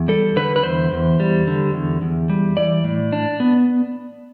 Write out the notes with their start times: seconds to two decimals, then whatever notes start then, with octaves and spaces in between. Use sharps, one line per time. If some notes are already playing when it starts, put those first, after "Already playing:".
Already playing: E2
0.08 G3 A4
0.36 D3 B4
0.56 B4
0.63 E2 C5
0.92 E2
1.20 G3
1.47 D3
1.74 E2
2.02 E2
2.30 G3
2.57 E3 D5
2.84 A2
3.13 D4
3.40 B3